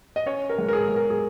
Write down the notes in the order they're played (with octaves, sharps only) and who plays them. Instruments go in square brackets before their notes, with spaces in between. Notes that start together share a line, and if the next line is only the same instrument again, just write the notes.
[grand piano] D#5
C#4 C#5
A#4
G#3
A#4
G#4
G#3
A#4
G#4